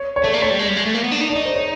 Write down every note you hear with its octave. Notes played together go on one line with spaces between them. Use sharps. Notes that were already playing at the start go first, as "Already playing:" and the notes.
Already playing: C#5
C#5
A3 D5
A#3
A3 C#5
G3
G#3
G3
G#3
A3
A#3
B3
D4
D#4
D4 D5
D#4
C5
C#5